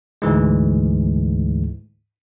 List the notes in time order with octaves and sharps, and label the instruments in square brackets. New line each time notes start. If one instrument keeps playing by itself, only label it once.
[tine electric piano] D2 G#2 E3 G#3